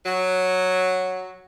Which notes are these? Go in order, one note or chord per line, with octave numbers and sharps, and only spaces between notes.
F#3